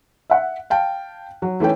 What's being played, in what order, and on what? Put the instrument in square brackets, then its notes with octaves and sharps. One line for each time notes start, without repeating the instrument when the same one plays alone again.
[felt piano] E5 F#5
F5 G5 A5
F#3
E3 A3 C#4 G5